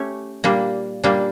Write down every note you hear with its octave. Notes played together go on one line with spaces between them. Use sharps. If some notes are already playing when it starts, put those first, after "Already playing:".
Already playing: A3 C#4 G4 C#5
A#2 G3 A#3 D4
A#2 G3 A#3 D4